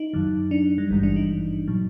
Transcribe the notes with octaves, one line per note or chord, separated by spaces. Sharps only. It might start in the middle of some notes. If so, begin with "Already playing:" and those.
Already playing: D#4
F#2 D#3 F#3
D4
G3
G#1 G2 E3 G3 G#3
D4
D#4
A#2 F#3